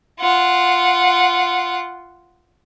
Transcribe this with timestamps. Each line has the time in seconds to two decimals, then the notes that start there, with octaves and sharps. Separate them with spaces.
0.20 F4 F#5